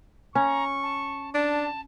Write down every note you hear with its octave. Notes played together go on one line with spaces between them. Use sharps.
C#4 A#5 C#6
A5
D4 A5